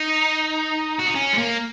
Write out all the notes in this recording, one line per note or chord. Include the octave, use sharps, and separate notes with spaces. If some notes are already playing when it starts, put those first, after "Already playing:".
Already playing: D#4
F#4
D#4
C#4
G#3
A#3